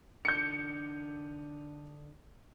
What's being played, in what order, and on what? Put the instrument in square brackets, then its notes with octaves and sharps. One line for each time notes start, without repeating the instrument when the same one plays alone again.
[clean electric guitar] D3 D4 D#4 [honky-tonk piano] G6 C#7